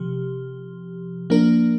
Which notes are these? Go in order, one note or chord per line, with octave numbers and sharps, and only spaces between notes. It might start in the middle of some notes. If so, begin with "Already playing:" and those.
Already playing: C3 F3 G4
F3 A#3 D4 A#4